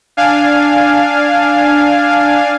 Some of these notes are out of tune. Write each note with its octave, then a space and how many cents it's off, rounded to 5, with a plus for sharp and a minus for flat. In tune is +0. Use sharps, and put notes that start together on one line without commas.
D4 +0 F5 +0 G#5 +0